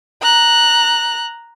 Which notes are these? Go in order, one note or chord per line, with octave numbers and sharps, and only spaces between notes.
A#5 F#6